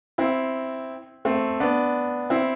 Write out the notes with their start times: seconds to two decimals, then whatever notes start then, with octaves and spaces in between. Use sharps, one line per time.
0.18 C4 E4
1.25 A3 C4
1.60 B3 D4
2.30 C4 E4